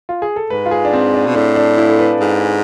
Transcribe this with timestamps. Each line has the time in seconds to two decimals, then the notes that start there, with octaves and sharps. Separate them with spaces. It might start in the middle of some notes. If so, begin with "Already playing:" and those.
0.09 F4
0.22 G#4
0.36 A4
0.50 G#2 B4
0.66 F4
0.71 G#4
0.85 D4
0.93 C4
1.14 D4
1.26 B2
1.35 A2 D4
1.56 D4
1.78 E4
1.90 A4
1.99 B4
2.20 G#2